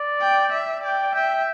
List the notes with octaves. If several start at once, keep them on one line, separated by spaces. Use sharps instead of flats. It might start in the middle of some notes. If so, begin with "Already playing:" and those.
Already playing: D5
G5
E5
D5 G5
E5 G5